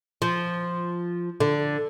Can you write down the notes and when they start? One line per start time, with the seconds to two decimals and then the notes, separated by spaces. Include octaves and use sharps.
0.22 F3
1.40 D3